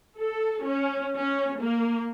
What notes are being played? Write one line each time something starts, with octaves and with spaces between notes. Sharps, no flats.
A4
C#4
C#4
A#3